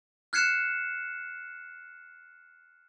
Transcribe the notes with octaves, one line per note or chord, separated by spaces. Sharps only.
F6 F#6 G#6 C7 C#7 E7